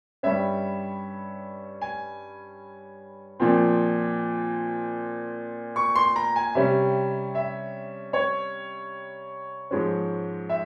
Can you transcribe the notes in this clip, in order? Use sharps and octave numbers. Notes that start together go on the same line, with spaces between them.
G2 G3 C#4 E5
G#5
A#2 F3 C4
C#6
C6
A#5
G#5
C3 G3 C#4 E5
E5
C#5
G#2 F3 G#3 C#4
E5